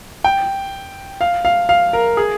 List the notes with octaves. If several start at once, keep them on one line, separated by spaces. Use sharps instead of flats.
G5
F5
F5
F5
A#4
G#4